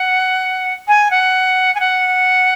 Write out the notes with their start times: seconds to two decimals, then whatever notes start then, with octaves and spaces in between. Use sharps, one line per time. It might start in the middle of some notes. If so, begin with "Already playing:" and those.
Already playing: F#5
0.87 G#5
1.10 F#5
1.74 G#5
1.80 F#5